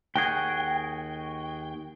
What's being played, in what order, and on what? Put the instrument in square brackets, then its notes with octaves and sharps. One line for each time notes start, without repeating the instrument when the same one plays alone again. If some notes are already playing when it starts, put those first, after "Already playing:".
[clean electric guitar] D#2 F#4 G#4 [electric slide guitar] G5